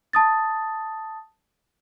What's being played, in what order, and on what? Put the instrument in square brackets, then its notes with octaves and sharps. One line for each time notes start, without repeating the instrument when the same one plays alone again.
[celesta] A5 D#6 A6